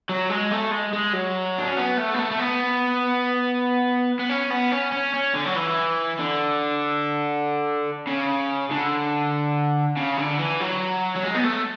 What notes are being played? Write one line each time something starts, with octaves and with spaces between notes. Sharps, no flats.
F#3
G#3
A3
G#3
G#3
F#3
D4
C#4
B3
A3
B3
A3
A3
B3
B3
C#4
B3
C#4
C#4
C#4
D3
F#3
E3
D3
C#3
D3
C#3
D3
E3
F#3
F#3
G#3
B3
A3